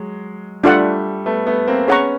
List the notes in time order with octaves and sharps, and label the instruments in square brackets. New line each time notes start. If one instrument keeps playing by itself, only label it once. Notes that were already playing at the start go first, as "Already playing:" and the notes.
Already playing: [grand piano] F#3 G#3
[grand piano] G3 A3 [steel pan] D4 F4 A4 D5 F#5
[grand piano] A3 B3
A3 B3
A#3 C4
[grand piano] B3 C#4 [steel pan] G#4 C#5 F#5 A#5 C#6